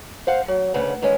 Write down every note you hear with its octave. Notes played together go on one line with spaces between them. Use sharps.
C5 F5 F#5
F#3
D2 C#3 B4 F#5
D#3 E3 G#3 C#4